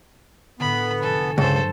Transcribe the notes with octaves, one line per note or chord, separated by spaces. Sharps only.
A2 D3 B3 B5
F1 A4 G#5
C#2 G2 F#3 A4 C5